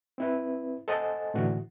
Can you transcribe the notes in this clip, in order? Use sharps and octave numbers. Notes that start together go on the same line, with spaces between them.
C4 E4 B4
A4 C5 D#5 F#5 G#5 A5
A2 D3 E3 F#4